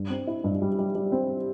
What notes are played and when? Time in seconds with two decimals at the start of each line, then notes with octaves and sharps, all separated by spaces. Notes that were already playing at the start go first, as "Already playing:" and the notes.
Already playing: G2
0.10 C4
0.27 E4
0.44 G2
0.62 G3
0.79 G3
0.95 G3
1.12 C4